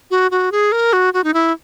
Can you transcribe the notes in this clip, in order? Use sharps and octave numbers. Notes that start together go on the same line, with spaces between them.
F#4
F#4
G#4
A#4
F#4
F#4
D#4
E4